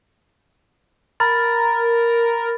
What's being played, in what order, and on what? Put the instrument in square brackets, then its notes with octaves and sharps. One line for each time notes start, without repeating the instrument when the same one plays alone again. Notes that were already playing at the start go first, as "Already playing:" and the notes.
[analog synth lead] A#4 [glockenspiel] B5 A6